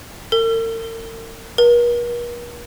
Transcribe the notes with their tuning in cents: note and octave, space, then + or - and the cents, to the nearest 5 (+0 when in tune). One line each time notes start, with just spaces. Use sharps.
A#4 -45
A#4 +45